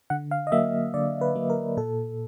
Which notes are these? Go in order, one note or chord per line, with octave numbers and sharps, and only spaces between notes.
D3 F#5
F5
D#5
F#3 A#3 E5
D3 D5
B4
F#3 A#3
A#4
A#2 A4